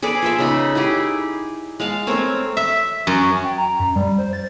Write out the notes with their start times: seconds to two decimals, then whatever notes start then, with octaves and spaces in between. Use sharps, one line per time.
0.02 G#4 A4 B4 D5
0.22 F4 A4 E5
0.39 C#3 D#4 B5
0.75 D#4 E4 G4 G#4
1.80 G#3 F5 A5
2.07 A3 C4 A#4 C#5
2.57 E5
3.07 F#2
3.44 G5
3.58 A#5
3.79 F#2
3.96 G3
4.18 C5
4.33 A6